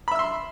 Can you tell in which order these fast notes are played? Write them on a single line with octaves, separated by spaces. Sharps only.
B5 E5 E6 C6